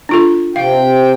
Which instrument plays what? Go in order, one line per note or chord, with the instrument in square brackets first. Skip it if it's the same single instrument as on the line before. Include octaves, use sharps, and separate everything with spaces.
[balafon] D4 F4 A4
[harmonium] C3 G5 [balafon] F5